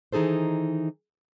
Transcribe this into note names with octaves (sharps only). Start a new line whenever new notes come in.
D#3 E3 D#4 G#4 A4 C5